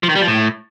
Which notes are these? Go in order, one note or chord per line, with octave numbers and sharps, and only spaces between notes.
F3
D#3
G3
F3
A2